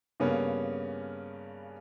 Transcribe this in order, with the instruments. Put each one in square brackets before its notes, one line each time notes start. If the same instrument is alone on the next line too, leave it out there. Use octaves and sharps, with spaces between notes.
[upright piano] G2 C#3 A#3 B3 C#4